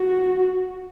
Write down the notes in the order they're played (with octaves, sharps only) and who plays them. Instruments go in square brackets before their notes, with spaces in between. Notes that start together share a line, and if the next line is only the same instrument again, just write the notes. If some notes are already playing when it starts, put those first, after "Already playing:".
Already playing: [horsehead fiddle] F#4